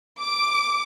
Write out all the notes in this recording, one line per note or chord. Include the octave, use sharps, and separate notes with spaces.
D6